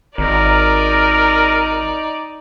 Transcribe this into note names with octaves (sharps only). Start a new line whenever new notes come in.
G#1 D#4 A#4 D5